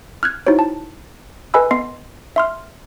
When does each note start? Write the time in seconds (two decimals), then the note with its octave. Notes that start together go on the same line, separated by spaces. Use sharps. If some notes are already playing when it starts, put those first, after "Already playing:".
0.23 F6 F#6 G#6
0.47 D#4 E4 F#4 C5 C#5
0.59 A5
1.54 A4 B4 D#5 G#5 B5 E6
1.71 B3 D#5 C6 C7
2.36 E5 C6 F6